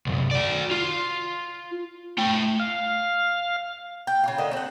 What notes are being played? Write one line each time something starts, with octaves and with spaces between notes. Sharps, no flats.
C2 F#2
F#4 D5
F4
A3 G5
F5
G5
C#3 F4
D3 A#4 D#5
C4 F#5